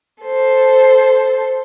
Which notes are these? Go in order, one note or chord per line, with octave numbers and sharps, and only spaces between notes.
A4 C5